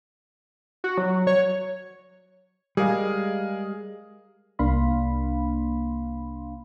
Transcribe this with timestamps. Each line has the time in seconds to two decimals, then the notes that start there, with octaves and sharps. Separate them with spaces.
0.84 F#4
0.98 F#3
1.27 C#5
2.77 G3 G#3 G#4 A#4 F5
4.59 C2 A#3 D4 F5 B5 C6